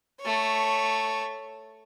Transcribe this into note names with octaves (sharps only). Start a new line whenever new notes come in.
A3 C#5